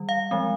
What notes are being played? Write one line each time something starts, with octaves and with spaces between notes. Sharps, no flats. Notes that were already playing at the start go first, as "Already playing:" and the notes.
Already playing: D#3 G3
F5
F3 G#3 C4